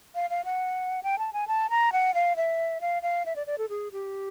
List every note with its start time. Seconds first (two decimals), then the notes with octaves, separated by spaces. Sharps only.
0.15 F5
0.30 F5
0.45 F#5
1.03 G5
1.19 A5
1.33 G#5
1.48 A5
1.70 A#5
1.92 F#5
2.14 F5
2.36 E5
2.81 F5
3.02 F5
3.26 E5
3.36 D5
3.47 D5
3.58 A4
3.69 G#4
3.92 G4